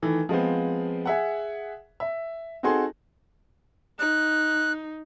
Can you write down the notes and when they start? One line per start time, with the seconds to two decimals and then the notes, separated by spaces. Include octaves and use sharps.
0.02 D#3 E3 A3
0.29 F3 G#3 B3 C4
1.06 G#4 E5 F#5
2.00 E5
2.63 C4 D#4 F#4 G#4 A4 C6
3.99 D#4 F#6